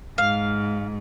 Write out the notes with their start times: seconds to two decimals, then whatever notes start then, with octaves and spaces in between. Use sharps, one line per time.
0.18 G#2 F5